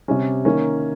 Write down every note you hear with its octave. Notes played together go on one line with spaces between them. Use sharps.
C3 G3 C#4
D#3 A#3 C#4